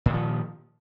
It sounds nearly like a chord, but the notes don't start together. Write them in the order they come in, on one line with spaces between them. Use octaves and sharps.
A#2 D#3 F3